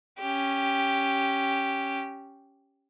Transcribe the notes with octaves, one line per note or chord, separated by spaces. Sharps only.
C#4 G4